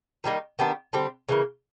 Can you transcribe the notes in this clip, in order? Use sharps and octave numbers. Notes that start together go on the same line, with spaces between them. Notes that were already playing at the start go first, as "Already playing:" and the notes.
D#3 G3 A#3 D#4
D#3 G3 B3 D4
D3 G3 C4
C#3 E3 G3 A#3